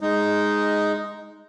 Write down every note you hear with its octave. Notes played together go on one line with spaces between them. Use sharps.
G#3 D#4